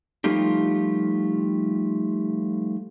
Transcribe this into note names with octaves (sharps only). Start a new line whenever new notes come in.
F3 G3 A3 D#4 F4 G4